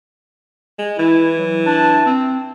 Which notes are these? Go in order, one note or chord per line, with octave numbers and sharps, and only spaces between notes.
G#3
E3 E4
F#3
D4
C4